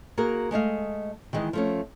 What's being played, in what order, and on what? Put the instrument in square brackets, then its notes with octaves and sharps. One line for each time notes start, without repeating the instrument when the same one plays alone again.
[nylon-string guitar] A#3 F#4 G#4 A#4
G#3 A3 D#5 F5
D#3 E3 G#3 D#5
F3 A3 C#4